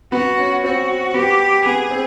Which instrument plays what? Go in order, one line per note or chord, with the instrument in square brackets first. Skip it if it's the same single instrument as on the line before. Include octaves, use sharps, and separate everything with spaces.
[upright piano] B3 [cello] F#4
[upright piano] C#4
[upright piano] C4 [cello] F#4
[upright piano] B3 [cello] G4
[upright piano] B3 [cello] G#4
[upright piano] C4